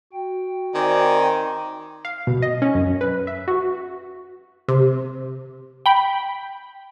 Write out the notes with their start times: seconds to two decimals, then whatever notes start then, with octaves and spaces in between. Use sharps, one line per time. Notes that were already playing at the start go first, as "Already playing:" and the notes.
0.13 F#4 G5
0.75 D#3 C4 D5 G#5
2.05 F5
2.27 B2
2.42 D#5
2.62 C#4
2.75 F#2
3.01 B4
3.27 E5
3.48 F#4
4.68 C3
5.86 G5 B5